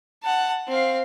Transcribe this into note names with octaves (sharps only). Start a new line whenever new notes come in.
F#5 A5
C4 F5